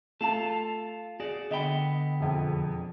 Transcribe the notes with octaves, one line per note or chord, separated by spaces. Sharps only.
A3 F4 A4 A5
F#4 G#4 D5
D3 B3 D#5 G5 B5
E1 F2 F3